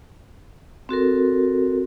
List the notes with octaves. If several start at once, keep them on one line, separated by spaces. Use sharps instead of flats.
C4 F#4 A4 A#4